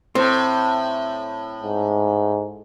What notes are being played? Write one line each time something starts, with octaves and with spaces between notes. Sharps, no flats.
A2 C4
G#2